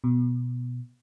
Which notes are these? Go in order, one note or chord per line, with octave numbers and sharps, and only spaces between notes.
B2